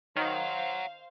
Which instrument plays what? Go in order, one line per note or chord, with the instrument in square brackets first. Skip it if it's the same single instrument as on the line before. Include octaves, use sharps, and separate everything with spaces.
[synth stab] D#3 [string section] C5 F5 [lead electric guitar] C#5 F#5